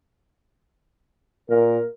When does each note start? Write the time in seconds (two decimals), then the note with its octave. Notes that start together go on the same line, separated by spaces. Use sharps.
1.50 A#2 A#4